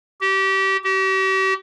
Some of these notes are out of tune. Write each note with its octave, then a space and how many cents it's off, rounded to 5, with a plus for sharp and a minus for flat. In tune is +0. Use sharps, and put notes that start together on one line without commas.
G4 -25
G4 -40